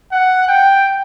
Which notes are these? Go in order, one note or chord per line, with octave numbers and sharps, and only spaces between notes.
F#5
G5